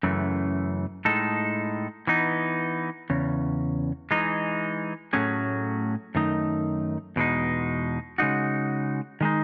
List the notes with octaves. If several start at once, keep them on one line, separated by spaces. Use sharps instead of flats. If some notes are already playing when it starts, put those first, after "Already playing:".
F#2 C#3 E3 A3
A2 G#3 D#4 A4
E3 B3 D#4
E2 C#3 C#4
E3 G#3 D#4
A2 F#3 A3 C#4 G#4
F#2 D#3 A3 D#4
E2 B2 G#3 D#4
C#3 G#3 D#4 F#4
D#3 G#3 D#4